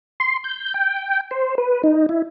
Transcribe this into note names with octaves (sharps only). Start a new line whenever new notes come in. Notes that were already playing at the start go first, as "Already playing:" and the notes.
C6
G6
G5
C5
B4
D#4
E4